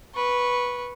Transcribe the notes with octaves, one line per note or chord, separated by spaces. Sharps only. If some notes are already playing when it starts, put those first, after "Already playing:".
B4 C#6